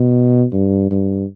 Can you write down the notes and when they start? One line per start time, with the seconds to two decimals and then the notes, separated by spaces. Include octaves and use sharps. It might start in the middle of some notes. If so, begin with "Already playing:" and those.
Already playing: B2
0.53 G2
0.91 G2